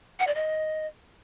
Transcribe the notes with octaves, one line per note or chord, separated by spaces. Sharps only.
F#5
D5
D#5